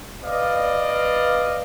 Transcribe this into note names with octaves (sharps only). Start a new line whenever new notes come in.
B4 D5 D#5 F5